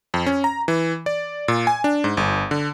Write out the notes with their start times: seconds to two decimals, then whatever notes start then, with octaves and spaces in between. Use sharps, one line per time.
0.14 F2
0.26 C#4
0.44 A#5
0.68 E3
1.06 D5
1.48 A#2
1.67 G#5
1.84 D4
2.04 G#2
2.17 G1
2.51 D3